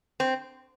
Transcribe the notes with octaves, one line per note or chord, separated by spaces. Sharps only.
C4